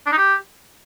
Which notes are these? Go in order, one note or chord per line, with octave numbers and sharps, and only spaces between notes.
D4
D#4
G4